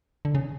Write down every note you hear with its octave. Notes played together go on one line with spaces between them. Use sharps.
D3
C#3